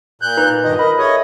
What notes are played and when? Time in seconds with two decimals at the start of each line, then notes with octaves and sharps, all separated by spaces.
0.22 A#2 F#6 G6
0.37 D#4 B4 A#5
0.64 G2 D#3 F4 D#5
0.79 A#4 D#5 B5
0.98 G#4 A4 C#5 D#5 E5